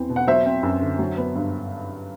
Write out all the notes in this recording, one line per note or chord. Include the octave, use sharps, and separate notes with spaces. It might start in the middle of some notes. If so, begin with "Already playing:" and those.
Already playing: E2 C4
B2
F#5
F#3 C5 E5
C4
F#2
D3
F#3
B3
G2